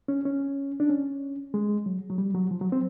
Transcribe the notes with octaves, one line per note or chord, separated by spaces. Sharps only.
C#4
C#4
D4
C#4
G#3
F#3
F#3
G3
F#3
F3
F#3
C4